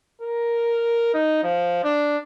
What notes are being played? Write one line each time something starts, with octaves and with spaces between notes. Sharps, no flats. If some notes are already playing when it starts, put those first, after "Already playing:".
A#4
D#4
F3
D4